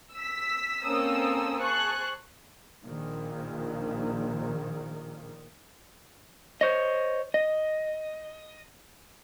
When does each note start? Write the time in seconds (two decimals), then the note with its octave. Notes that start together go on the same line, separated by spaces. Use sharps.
0.13 E6 B6
0.84 A#3 C4 C#4 A4 D#6 E6
1.58 G#4 C5 A5 C#6 F#6
2.84 A#1 A#2 D#3
6.61 C5 C#5 D#5
7.34 D#5